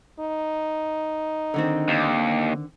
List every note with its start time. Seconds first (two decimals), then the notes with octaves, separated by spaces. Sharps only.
0.20 D#4
1.54 D3 D#3 C4
1.88 D#2